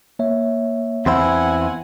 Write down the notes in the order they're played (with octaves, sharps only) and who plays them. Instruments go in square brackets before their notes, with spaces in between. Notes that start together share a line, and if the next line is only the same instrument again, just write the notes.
[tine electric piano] A#3 C#5 E5
[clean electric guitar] E2 C4 E4 [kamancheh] F#5 G#5 [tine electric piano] C6